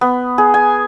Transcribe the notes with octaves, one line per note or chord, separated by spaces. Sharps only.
B3
G#4
G#5